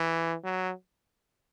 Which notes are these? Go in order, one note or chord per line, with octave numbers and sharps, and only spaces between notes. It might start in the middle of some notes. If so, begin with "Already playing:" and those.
Already playing: E3
F#3